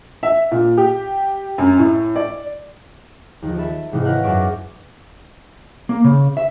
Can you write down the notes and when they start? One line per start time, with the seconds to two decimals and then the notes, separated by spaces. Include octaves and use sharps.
0.23 E5
0.51 A#2
0.77 G4
1.58 F#2
1.78 A2
2.16 D5
3.42 D#2 D#3 F3
3.58 A4 E5 B5
3.92 G#2 C3 D#3 E3 A3
4.05 E4 A#4 B4 C#5 F5 F#5
4.23 F#2 A#4 E5 C#6 D6 D7
5.89 A#3
6.04 C#3
6.37 E5